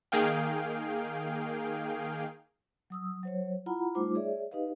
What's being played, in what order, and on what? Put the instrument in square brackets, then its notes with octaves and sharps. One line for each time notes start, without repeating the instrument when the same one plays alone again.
[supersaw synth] D#3 A#3 G#4 F5 G5
[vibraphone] F#3 D#6 E6
F#3 C5 C#5
E4 F4 F#5 A#5 B5
G3 A3 D#4 F4 C5 D6
G#4 C#5 D5 E5
D#4 G4 B4 D#5 F5